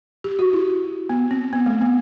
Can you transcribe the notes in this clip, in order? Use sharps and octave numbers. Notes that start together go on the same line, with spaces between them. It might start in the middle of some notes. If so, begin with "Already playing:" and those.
G4
F#4
E4
B3
C4
B3
A3
B3